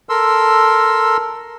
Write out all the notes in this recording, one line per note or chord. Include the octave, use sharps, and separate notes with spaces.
A4 A#4 C6 E6